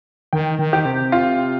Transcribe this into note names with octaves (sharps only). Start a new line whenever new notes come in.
D#3 G5
D#3
G4
C3
F4